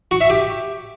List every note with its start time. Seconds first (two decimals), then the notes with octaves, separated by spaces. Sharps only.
0.11 F#4
0.21 E5
0.30 G4